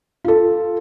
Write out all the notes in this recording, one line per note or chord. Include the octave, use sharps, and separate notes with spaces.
F4 A4